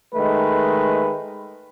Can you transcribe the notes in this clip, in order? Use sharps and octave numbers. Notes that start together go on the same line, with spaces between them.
D#3 G#3 A3 B4